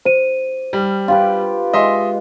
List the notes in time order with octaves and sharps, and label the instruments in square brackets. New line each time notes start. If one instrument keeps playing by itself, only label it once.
[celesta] C5 D#7 [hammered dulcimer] D6
[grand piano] G3
[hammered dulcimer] F4 G4 B4
[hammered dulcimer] G#3 [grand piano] D#5 E5 C6